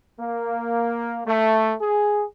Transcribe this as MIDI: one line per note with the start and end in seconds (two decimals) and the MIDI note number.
0.19 1.20 58
1.26 1.73 57
1.79 2.23 68